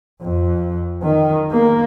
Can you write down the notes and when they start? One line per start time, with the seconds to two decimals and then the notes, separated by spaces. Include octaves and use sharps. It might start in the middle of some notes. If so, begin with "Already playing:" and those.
0.22 F2
1.03 D#3
1.51 A#3